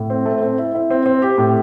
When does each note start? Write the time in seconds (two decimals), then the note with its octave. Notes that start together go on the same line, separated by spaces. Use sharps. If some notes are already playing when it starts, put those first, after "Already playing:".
Already playing: A2
0.10 C4
0.26 A3
0.41 C4
0.58 E4
0.75 E4
0.90 C4
1.06 C4
1.22 G4
1.38 A2